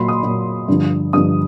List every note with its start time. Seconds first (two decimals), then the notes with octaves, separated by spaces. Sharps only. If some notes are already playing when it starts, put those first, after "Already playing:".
Already playing: A#2 F#3 B5 C6
0.08 D#6
0.23 A#2 F#3
0.68 G2 D3 F3
1.13 G2 D3 F3 D#6